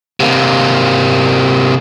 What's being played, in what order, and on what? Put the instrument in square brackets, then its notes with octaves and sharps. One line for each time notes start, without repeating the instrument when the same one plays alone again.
[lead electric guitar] C3 A#3